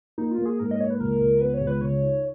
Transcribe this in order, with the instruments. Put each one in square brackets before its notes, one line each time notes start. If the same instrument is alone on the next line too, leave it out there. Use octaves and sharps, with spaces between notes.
[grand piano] A#3 [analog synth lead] D#4
[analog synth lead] F4
[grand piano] A#3
[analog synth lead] G#4
[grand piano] G#2 [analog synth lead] A#4
[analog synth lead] D#5
[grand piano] A#3 [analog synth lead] C#5
[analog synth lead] B4
[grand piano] C#2 [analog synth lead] A#4
[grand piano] C#2
[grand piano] B3 [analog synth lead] B4
[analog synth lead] C#5
[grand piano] C#2
[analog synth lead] B4
[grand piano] C#3 [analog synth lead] C#5
[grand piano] D#4